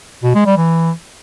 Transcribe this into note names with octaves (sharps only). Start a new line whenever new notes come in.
B2
G#3
G3
E3